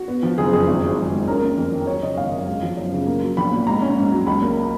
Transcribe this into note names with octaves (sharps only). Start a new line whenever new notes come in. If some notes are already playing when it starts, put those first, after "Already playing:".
Already playing: F#4
B3
F3
F#1 G#4
F2 G#4
G#1
F#3
G#1
G#2
C#4 A#4
A#3
F2
D#3
F#3 C#5
C#3 D#5
G#1 F5
F#2
G#3
F3
F#2
C#3
A#3
F#3
A#1 B5
A#2
G#2 A#5
C#4
G#2
F#3
C#2 B5
A#3